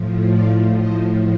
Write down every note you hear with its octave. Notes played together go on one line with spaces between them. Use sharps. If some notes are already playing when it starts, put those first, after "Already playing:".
Already playing: A2 F3
D5 F5
A2 F3 C5 D#5